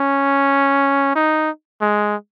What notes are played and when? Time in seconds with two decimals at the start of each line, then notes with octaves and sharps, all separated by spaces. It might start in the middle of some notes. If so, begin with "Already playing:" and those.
Already playing: C#4
1.16 D#4
1.81 G#3